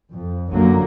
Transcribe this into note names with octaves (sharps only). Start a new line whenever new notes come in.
F2
G1 F#2 D3 F#3 A#3